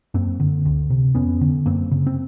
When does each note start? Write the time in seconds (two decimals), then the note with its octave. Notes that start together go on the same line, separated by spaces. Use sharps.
0.14 F#2 A#3 C4
0.40 D3
0.66 D2
0.90 C3
1.15 F2 B3 C#4
1.41 D3
1.66 F#2 A#3 C4
1.91 C#3
2.07 C4